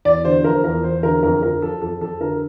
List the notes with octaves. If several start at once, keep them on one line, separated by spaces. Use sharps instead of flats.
E2 D5
D3 C5
F3 A#4
E2 A#4
E2 C5
D3 A#4
F2 A#4
D3 A#4
F3 A4
F2 A4
F2 A4
D3 A#4